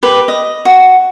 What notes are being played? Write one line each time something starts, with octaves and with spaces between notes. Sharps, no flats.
G4 B4
D#5
F#4